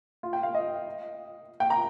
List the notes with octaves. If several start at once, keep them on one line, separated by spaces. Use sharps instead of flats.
F4
G5
F5
D#5
G5
A#5